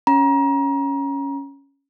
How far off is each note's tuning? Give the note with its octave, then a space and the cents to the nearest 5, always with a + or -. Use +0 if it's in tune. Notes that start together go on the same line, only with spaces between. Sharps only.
C#4 +0 A#5 +30